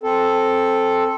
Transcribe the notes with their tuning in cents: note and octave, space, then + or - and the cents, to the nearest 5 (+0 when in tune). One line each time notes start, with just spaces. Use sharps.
C4 +10 A4 +0